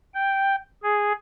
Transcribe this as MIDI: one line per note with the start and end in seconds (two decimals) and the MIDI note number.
0.14 0.56 79
0.83 1.13 68